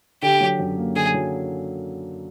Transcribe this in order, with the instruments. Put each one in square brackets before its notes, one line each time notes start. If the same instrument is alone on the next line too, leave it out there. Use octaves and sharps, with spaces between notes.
[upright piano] D3 [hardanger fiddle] G4
[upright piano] F#3
F#2
A#3
[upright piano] D3 [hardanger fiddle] G#4
[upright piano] F#3